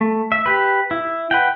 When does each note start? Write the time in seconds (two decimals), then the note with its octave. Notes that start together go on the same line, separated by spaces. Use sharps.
0.01 A3
0.32 E5
0.46 G4 B4
0.91 E4
1.31 B4 F#5 G5